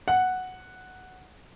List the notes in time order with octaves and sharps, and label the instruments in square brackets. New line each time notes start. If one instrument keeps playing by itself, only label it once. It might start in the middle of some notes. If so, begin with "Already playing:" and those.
[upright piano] F#5